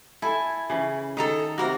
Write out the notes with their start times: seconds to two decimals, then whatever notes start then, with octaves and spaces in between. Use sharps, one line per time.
0.22 E4 A4 G#5
0.70 C#3 E3
1.17 D#3 A4 A#5 D#6
1.58 C3 A#3 F#4 A#4 A#5